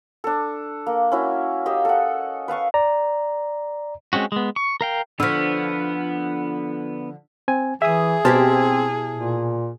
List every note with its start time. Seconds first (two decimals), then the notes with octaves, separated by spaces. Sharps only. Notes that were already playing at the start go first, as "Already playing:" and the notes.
0.24 D4 A4
0.86 A#3
1.12 C#4 E4 F#4
1.66 G4 D#5 F5 E6
1.85 A4 F#5
2.48 B4 F5 A5 C#6
2.74 D5 A#5
4.13 G#3 C4 C#4 F#4
4.32 G#3 B3
4.56 C#6
4.81 A#4 F5 G5
5.20 D3 F3 B3 D4 C#6 E6 F6 B6
7.48 C4 G#5
7.82 E3 G#4 E5 D#6
8.25 B2 C4 E4 G4 C5 A5 F6
9.15 A#2